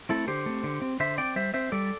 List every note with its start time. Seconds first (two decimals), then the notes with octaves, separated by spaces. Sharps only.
0.09 A3 C4 E4 A4
0.27 D3 G4 C5
0.46 A3 C4
0.64 D3
0.82 C4
1.00 D3 C5 E5
1.18 C4 D5 G5
1.36 G3 C5 E5
1.54 C4 C5 E5
1.72 G3 A4 D5